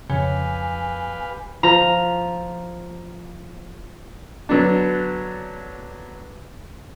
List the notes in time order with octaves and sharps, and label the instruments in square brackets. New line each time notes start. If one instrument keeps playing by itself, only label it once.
[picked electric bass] F2 [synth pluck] C#3 [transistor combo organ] G4 B4 F5 [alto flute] G#5
[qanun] F3 [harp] A#5
[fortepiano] D3 F#3 B3 D4